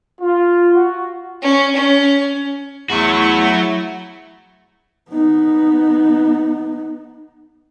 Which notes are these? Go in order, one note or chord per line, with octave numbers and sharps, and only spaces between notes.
F4
F#4
C#4
C#4
E2 F#3 A3 E4 F#4 F#5 C#6
B3 D#4